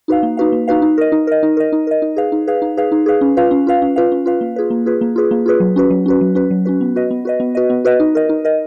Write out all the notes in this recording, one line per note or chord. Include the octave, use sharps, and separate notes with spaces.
D#4 F#4 B4 F5
A#3
D#4 F#4 B4 F5
A#3
D#4 F#4 B4 F5
D#4
A#4 D#5
D#4
A#4 D#5
D#4
A#4 D#5
D#4
A#4 D#5
D#4
G#4 B4 F5
D#4
G#4 B4 F5
D#4
G#4 B4 F5
D#4
G#4 B4 F5
C#4
F4 B4 F5
C#4
F4 B4 F5
C#4
F4 B4 F5
C#4
F4 B4 F5
A#3
F4 G#4 B4
A#3
F4 G#4 B4
A#3
F4 G#4 B4
A#3
F4 G#4 B4
F#3
C#4 F#4 B4
F#3
C#4 F#4 B4
F#3
C#4 F#4 B4
F#3
C#4 F#4 B4
B3
F#4 B4 D#5
B3
F#4 B4 D#5
B3
F#4 B4 D#5
B3
F#4 B4 D#5
D#4
A#4 D#5
D#4
A#4 D#5